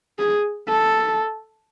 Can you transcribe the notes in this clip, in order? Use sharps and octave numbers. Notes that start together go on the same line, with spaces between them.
G#4
A4